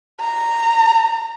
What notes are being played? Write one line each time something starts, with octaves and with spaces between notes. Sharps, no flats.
A#5